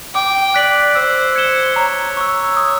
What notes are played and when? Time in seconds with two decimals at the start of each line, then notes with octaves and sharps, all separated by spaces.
0.14 G5 D6
0.54 D5 F#6 B6 D7 F#7
0.95 C5 E6
1.35 G#6 C#7 E7 G7
1.76 C#5 A#5
2.17 C#6 E6
2.57 D#6